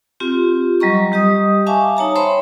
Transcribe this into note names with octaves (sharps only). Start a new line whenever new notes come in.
C4 F4 G4
F#3 G3 D#5 A#5 C#6
G3 G4 D#5 D#6
E5 F5 G#5 A5 C#6 D6
D#4 C#5 A5 A#5
C5 C#5 E5 G5 B5 C6